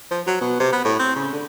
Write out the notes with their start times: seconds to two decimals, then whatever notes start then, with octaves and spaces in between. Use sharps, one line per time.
0.11 F3
0.27 F#3
0.41 B2
0.60 C3
0.72 B3
0.85 A2
0.99 C4
1.16 C#3
1.33 D3